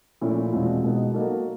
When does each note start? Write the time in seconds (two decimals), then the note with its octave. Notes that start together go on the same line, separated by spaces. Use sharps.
0.21 A#2 F3 A3 C#4 E4
0.52 E2 B2 G#3 C4 F4
0.83 B2 G#3 B3 D#4
1.14 F#3 A#3 D#4 F#4 A4